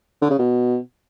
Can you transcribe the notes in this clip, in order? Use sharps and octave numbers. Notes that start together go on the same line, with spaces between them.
D3
C#3
B2